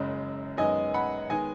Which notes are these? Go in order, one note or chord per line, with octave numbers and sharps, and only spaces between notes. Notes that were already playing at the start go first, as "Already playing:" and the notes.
Already playing: F#1 F#2 C#3 G#3
F#2 D#3 G#3 B3 D#5 G#5
F#5 B5
D#3 G#3 B3 D#5 G#5